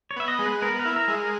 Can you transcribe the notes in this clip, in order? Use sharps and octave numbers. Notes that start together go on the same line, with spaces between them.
C#5
B3 E5
D#5
G#3
B4
B3 A#4
A#4
E4
A#4
G#3
A#4